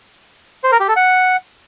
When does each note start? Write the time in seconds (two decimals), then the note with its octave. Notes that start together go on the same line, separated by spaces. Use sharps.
0.64 C5
0.72 A#4
0.80 G4
0.88 A4
0.96 F#5